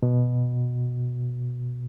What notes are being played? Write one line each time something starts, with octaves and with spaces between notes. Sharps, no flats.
B2